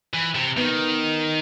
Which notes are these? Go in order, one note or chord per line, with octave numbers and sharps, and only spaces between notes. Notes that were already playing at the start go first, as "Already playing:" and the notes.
E3
C3
D#3 B3